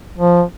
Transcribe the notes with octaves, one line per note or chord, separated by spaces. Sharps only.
F3